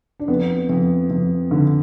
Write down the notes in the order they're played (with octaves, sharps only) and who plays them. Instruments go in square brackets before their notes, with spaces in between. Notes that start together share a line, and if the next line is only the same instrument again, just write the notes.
[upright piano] D4
F2 B3
F2
F2
D3